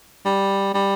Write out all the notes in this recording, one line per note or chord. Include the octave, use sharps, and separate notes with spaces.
G3
G3